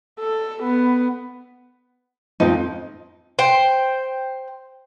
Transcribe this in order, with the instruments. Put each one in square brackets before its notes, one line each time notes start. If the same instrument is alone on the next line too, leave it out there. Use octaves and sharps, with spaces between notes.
[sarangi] A4
B3
[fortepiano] F2 F3 [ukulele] D#4
[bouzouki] C5 G5